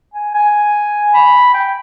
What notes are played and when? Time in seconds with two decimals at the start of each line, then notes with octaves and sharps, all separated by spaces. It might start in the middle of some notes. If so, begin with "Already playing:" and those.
0.14 G#5
0.35 G#5
1.14 B5
1.54 G5